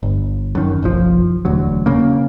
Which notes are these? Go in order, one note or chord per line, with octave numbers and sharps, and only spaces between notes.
G1
F#2 D#3
F#1 B1 F3
E1 D2 F#3
C#3 A#3